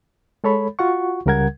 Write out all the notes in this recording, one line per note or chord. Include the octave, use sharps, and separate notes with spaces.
G#3 A4 C#5 B5
F4 F#4 F#5 C#6
C#2 C#3 G3 A#4 F#5 G#6